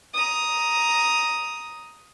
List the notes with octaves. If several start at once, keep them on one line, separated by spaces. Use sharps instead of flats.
A#5 D#6